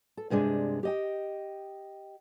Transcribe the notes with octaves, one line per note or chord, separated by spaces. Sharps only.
A4
G2 C3 G#3 D4
G4 D#5 G5